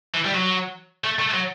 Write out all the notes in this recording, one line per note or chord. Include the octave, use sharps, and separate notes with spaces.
E3
G3
F#3
A3
A3
F#3